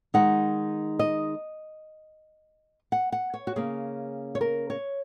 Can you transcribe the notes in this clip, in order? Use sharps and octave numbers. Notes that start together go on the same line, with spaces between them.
D#3 G#3 D#4 F#5
D#5
F#5
F#5
C#5
F#4
C#3 A#3 C#4 G#4
C#5
A#4
C#5